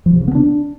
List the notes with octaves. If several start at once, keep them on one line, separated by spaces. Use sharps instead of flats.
F3
C3
C#3
B3
D4